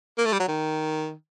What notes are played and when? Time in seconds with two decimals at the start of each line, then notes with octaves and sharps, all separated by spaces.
0.18 A#3
0.26 A3
0.33 G3
0.39 F#3
0.48 D#3